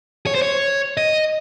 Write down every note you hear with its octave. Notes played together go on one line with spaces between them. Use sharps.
C#5
C5
C#5
D#5